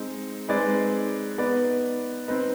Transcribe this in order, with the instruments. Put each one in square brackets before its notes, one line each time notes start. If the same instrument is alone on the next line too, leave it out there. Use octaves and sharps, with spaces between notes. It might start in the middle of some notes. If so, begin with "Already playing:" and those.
Already playing: [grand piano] G#3 C4 D#4
G#3 C4 D#4 B4 D5
B3 D#4 B4 D5
C4 D#4 B4 D#5